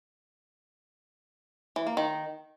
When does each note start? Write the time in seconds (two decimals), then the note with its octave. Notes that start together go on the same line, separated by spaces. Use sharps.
1.76 E3
1.87 A#3
1.97 D#3